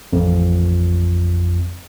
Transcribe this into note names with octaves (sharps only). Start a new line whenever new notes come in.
A1 F2